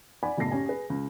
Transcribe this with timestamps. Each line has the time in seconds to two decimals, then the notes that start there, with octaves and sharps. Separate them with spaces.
0.23 D5 F#5 G#5 B5
0.37 F#1 B1 A2 A5 A#6 C7
0.51 C#4 G4 G#5
0.66 G#4 B4
0.90 C#2